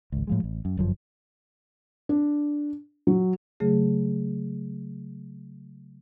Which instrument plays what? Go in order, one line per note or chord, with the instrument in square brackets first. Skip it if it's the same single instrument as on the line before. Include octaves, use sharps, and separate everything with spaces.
[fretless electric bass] G#1 C#2
A2 F3 G#3
A1
F#2
G1 F#2 F3
[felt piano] D4
F#3
[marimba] C#3 F#3 A3 G#4